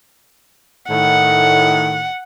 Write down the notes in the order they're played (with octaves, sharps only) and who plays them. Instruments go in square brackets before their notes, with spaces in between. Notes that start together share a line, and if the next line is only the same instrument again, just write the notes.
[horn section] A2 D#3 [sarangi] F#5